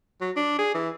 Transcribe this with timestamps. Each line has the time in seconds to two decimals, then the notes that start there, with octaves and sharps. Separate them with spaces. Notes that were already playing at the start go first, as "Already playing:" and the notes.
0.21 F#3
0.37 D4
0.59 G#4
0.75 E3